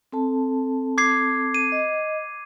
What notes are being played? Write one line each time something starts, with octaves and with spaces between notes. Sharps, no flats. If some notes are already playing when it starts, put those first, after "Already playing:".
C4 A4 A5
D6 G#6 C7
D#7
D#5